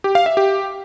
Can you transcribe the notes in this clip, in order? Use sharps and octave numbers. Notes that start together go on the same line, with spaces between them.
G4
F5
E5
G4